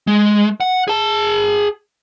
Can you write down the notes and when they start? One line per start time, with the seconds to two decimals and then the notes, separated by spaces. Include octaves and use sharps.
0.07 G#3
0.60 F#5
0.88 G#4 A5